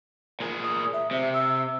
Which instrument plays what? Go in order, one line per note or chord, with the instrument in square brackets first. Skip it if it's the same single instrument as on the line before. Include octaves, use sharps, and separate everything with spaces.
[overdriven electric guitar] A#2 G#4
[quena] D#6
E5
[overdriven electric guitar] C3 [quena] E5
[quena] E6